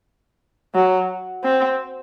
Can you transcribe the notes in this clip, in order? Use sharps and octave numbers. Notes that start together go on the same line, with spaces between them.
F#3
C4